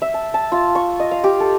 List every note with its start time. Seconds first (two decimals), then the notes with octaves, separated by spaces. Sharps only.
0.02 E5
0.14 A5
0.34 A5
0.52 F4
0.75 C#6
1.00 D#5
1.11 F5
1.24 G4
1.40 A4